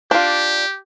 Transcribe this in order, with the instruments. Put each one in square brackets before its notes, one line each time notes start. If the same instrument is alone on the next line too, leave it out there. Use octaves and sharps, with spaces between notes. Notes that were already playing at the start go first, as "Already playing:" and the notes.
[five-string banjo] D4 F4 [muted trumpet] G4